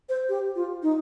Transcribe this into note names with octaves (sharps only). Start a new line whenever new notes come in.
C5
G4
F4
D#4